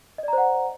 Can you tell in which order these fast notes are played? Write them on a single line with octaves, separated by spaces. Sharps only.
D#5 D5 A#5 C5 F#5